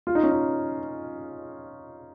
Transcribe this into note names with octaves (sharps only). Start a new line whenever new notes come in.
F4
D#4
C#4
D#4